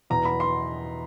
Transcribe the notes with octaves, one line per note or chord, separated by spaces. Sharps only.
E2 B2 A#5
B5
C6